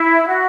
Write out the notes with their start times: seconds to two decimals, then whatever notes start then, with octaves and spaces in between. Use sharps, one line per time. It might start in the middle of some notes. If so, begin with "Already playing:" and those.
Already playing: E4
0.27 F#4